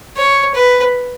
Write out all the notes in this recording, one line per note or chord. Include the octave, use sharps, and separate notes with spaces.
C#5
B4